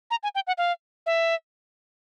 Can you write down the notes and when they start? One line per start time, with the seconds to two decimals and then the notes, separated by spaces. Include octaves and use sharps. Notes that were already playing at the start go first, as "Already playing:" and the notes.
0.11 A#5
0.23 G#5
0.35 G5
0.47 F#5
0.58 F5
1.06 E5